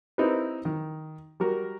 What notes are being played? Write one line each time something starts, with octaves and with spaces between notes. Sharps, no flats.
C4 D#4 E4 G4 A#4 B4
D#3
G3 F#4 A#4